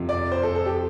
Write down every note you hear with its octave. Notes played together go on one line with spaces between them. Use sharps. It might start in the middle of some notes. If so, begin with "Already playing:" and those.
Already playing: F2 C3 F3
D5
C5
A4
A4
G4